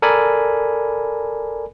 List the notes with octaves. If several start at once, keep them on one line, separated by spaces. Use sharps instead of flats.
A4 A#4 D5 G#5 B5